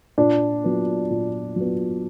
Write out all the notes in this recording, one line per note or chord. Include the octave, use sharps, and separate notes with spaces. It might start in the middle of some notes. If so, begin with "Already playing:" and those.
A#2 D4
F#3 B3
A#2
F#3 B3